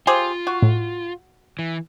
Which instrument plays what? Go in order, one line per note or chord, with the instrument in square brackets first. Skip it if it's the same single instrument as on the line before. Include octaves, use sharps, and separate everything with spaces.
[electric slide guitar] F4 [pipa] G4 G#4 C5
[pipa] F#4
[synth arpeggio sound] A2
[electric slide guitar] E3